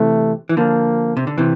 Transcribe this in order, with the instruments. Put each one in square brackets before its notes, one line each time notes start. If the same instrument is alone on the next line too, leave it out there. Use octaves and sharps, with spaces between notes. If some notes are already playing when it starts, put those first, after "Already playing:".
Already playing: [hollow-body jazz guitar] C3 E3 [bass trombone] A3
[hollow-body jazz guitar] E3
[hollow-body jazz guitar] D3 F3 [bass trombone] A#3
[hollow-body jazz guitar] C3
D3
C3 E3